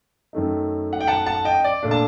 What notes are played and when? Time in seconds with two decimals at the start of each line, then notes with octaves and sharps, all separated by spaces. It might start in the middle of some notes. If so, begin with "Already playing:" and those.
0.33 F#2 D#3 A3 D#4
0.93 F#5
1.01 G5
1.07 F#5 A5
1.26 F#5 A5
1.45 D#5 G5
1.64 D5
1.83 A#2 A3 D4
1.91 A5